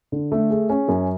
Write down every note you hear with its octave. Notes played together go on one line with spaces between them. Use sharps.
D3
A3
G#4
C#4
F#2